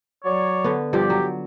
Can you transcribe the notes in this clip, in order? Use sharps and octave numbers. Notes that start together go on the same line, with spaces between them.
F#3 C#5 D5
D3 B3
G2 F3 G4 D5
F#3